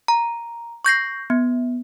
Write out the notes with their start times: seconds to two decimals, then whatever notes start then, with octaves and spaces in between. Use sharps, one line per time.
0.08 A#5
0.85 C#6 G6 A#6 C7
1.30 B3